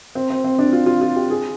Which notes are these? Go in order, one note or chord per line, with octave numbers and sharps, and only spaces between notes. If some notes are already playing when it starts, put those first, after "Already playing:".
C4
C4
C4
D4
F4
F4
F4
G4
G#4